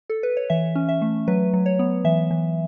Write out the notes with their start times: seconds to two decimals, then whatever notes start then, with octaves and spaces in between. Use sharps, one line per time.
0.10 A4
0.23 B4
0.37 C#5
0.50 E3 E5
0.75 C#4
0.89 E5
1.02 A3
1.28 F#3 B4
1.54 F#3
1.66 C#5
1.79 B3
2.04 E3 E5
2.31 E3